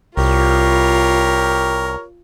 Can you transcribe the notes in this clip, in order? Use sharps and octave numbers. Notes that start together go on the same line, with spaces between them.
C2 F4 G4 A#4 C#5